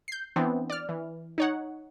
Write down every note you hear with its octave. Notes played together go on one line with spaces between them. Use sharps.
G6 C7
E3 B3 C4 D4
D5 F6
E3
D#4 C#5 F#5